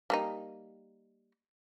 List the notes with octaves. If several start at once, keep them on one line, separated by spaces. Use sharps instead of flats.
G3 A#3 D#4